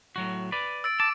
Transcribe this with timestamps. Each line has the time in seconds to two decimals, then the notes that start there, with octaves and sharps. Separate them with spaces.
0.16 A2 F#3 F#4
0.52 B4 D5
0.84 E6 A6 D7
1.00 A5 D6 D7